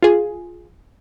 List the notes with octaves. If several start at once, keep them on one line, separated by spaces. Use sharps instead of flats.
F4 G#4